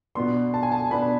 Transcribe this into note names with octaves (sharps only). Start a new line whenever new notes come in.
B2 B3 D4 C6
A5
G#5
A5
B2 B3 D4 B5